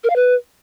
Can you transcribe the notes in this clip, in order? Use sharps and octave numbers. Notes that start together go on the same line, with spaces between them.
A#4
F5
B4